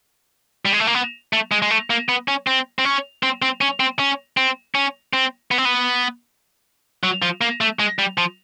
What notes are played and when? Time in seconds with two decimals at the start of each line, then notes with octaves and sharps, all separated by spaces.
0.65 G3
0.73 G#3
0.80 A3
0.87 A#3
0.95 B3
1.33 A3
1.52 G#3
1.62 G#3
1.70 A3
1.90 A#3
2.09 B3
2.28 C#4
2.47 C4
2.79 C4
2.85 C#4
3.23 C4
3.42 C4
3.61 C#4
3.80 C4
3.99 C#4
4.37 C4
4.75 C#4
5.13 C4
5.51 B3
5.58 C4
5.65 B3
7.04 F#3
7.22 F3
7.41 A#3
7.61 A3
7.79 G#3
7.99 G3
8.18 F3